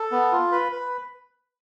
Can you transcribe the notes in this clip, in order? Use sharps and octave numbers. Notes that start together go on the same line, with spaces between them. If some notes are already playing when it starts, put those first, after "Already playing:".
Already playing: A4
B3
F4
B4
B4